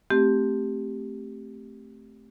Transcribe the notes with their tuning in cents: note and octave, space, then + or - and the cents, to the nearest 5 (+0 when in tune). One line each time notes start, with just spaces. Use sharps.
A3 +0 C4 +0 G4 +0